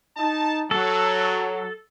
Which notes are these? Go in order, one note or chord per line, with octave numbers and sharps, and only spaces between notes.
D#4 A5
F#3 A4